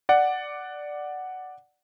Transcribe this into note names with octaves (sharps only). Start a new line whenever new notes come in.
D5 F#5